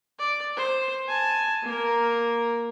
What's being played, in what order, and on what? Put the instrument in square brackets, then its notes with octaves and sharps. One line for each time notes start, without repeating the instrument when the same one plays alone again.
[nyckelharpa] D5
C5
G#5 A5
A#3 A#4